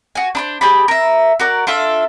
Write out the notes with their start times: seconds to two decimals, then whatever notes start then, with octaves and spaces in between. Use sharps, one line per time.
0.15 F#4 G#5
0.35 D4 B4 C5
0.61 G4 G#4 D5 B5
0.88 A#4 E5
1.40 F#4 A#4 D5
1.67 D4 F4 A4 E5